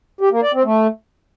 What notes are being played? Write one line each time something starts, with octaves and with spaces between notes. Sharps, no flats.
G4
A#3
D5
C4
A3